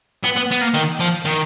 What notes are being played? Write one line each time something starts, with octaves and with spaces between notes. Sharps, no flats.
B3
B3
B3
A#3
D#3
F3
D#3